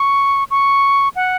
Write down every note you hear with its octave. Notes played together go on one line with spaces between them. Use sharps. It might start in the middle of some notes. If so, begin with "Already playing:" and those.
Already playing: C#6
C#6
F#5